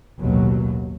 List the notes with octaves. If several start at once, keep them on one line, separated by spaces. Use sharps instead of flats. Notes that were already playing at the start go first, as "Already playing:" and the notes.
A1 D#2 B2 F#3